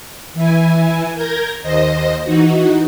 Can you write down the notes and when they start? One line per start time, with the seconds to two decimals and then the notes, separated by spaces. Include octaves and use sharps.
0.34 E3 E4 G#5
1.14 A#4 G6 G#6 A#6
1.62 D#2 C5 D#5 A#6
2.24 E3 D#4 F#4